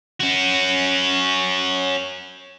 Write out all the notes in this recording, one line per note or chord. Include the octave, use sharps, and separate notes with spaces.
C#4 F#4